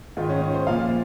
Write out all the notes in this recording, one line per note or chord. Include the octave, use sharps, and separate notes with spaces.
G#2 D#3 F4
C#4
C#4
C5
A#2 F3 F5